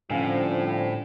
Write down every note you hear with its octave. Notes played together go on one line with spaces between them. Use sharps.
A2 D3 F3 G3 C4 C#4 F5 G#5